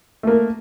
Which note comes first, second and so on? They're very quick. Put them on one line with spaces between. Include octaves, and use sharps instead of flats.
A3 A#3 A#4